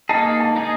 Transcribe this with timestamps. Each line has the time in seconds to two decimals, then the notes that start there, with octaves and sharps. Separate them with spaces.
0.09 A#3 D#4 G#4 A5
0.25 G#5
0.40 A5
0.56 A#3 D#4 G#4